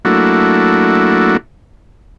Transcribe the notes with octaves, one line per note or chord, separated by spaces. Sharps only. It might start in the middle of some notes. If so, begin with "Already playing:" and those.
F#3 A3 A#3 D4 E4 F#4